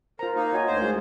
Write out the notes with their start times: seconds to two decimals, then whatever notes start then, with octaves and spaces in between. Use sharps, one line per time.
0.19 F4 A#4 C5 A#5
0.36 A#3 D#4 F5
0.52 F4 F#4 C#5 D#5 G#5
0.67 D2 C5
0.81 G#3 F4 G#4